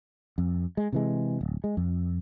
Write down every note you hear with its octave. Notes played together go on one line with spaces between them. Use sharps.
F2
G#3
C3 E3 G#3
D1
G#3
F2